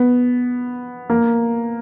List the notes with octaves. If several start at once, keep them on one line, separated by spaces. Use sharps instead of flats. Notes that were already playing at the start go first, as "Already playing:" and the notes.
Already playing: B3
A#3